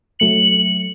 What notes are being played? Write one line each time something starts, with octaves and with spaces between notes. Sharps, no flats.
F#3 A3 C#7 F#7